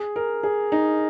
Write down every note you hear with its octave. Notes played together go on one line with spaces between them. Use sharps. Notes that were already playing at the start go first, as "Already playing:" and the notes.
Already playing: G#4
A#4
G#4
D#4